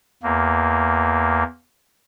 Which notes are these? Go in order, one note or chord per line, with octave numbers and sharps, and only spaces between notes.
E2 A#3